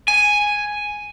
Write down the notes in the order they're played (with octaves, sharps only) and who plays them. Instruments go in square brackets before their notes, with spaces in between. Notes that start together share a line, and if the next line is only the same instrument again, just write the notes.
[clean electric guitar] G#5